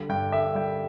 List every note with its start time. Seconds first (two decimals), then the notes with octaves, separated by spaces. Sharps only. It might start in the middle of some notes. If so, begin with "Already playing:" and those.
Already playing: D3 G3
0.09 G2 G5
0.32 D3 E5
0.55 G3 G5